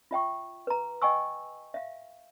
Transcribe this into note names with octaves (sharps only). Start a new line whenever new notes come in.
F4 E5 G5 C#6
B4 A#5
D#5 G5 G#5 C#6 E6
E5 F5